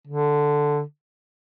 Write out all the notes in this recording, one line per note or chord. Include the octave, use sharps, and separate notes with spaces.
D3